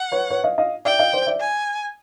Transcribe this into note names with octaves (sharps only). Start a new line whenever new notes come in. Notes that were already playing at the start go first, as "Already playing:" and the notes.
Already playing: F#5
B4 C#5
B4 C#5
D#5 F5
D#5 F5
D5 E5 G5
D#5 F5
C5 D5
D5 E5
G#5